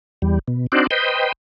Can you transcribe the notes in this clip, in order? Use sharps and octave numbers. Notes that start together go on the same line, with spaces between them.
E2 G3
B2
C4 D4 D#4 F#4 C5 D5
B4 C5 D#5 G5